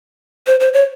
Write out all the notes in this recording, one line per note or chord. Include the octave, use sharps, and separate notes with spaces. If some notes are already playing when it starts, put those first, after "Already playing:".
C5
C5
C#5